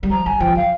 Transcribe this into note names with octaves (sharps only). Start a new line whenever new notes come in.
G3
F3 A#5
G3 G#5
F3 G5
F3 F5